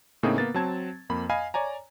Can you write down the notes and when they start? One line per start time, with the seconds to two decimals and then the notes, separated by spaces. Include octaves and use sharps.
0.23 A2 C#3 A#3 C4 D#4 G#4
0.38 A#3 B3 A6
0.54 F#3 C4 A5 G#6
1.09 F2 A#3 B5
1.29 D#5 F5 G#5 B5
1.54 C#5 D5 G#5 A#5